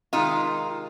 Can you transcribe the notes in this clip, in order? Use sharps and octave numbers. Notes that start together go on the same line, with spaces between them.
C3 D#3 G#3 D#4 F4